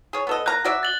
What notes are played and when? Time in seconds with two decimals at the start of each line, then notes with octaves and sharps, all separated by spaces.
0.13 G#4 C#5
0.27 B3 A4 D#5
0.46 A#3 A#5 F#6
0.64 F#4 D5 E5
0.83 A6 F#7 G7